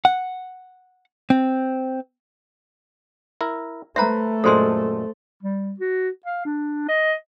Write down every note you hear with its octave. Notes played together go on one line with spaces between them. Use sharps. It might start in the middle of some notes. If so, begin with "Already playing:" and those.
F#5
C4
E4 A#4
A3 B4 C5 E5 A#5
F#2 A#2 G#3 A4 C5 C6
G3
F#4
F5
D4
D#5